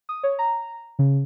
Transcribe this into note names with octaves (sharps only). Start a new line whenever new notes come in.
D#6
C#5
A#5
C#3